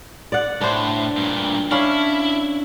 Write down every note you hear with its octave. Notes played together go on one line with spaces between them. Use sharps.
D5 F#5
A2 D4 C5
G2 A#2
C#4 D4 E4 F5